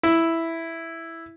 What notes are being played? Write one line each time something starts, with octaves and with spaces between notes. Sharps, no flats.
E4